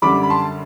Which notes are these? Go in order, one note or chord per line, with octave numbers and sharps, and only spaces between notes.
F#2 D3 G3 D4 B5 D6
B5
A5 C6